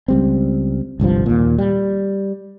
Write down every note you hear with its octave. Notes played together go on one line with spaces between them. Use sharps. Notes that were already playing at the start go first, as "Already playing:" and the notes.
C#2 G3 C4
G1 C2 G2 F3
D#2 A#2
G3